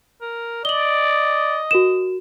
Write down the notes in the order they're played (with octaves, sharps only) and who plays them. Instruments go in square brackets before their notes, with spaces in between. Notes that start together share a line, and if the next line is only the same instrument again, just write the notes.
[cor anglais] A#4
[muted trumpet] D5 [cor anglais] D#5 [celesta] F#7 G7
[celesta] F#4 A#4 E7